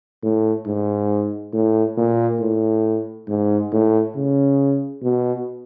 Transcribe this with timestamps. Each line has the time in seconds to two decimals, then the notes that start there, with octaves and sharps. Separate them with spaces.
0.23 A2
0.66 G#2
1.53 A2
1.98 A#2
2.40 A2
3.28 G#2
3.72 A2
4.15 C#3
5.03 B2